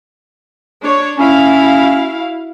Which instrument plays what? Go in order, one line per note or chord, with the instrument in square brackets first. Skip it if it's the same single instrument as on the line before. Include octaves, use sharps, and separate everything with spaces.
[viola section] D4 C#5
[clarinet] C#4 [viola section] E4 F#4 F5